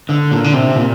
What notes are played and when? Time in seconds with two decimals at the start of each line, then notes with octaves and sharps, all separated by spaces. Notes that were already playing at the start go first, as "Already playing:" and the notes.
0.09 D3
0.31 A#2
0.44 D3
0.54 C3
0.76 A#2